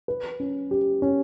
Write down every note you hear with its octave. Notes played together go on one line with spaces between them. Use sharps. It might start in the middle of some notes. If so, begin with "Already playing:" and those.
B4
C#4
G4
C#4